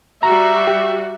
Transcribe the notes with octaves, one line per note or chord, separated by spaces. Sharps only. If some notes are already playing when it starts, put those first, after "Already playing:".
G3 F#4 E5 A#5
G4